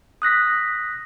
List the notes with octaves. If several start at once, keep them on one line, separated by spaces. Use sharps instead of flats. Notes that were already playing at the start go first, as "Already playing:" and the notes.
D#6 F#6 A#6 B6